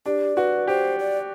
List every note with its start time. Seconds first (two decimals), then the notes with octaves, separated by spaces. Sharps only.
0.06 D4 G4
0.36 F#4 B4
0.67 G4 C5
0.99 D5